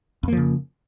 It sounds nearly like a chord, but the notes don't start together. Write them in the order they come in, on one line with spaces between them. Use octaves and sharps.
F2 A#3 F3 C#3